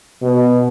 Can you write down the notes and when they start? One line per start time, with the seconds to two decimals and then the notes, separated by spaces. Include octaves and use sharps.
0.22 B2